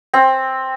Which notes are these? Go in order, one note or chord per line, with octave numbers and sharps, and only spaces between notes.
C4